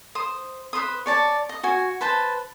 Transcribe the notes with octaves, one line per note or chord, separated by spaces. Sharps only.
C5 D#6
B4 C5 C6 D#6
C#5 D5 A5
D#5
F#4 G#5
B4 C5 A5